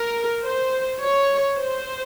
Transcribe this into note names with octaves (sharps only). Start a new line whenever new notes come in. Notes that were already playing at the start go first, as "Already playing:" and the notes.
Already playing: A#4
C5
C#5
C5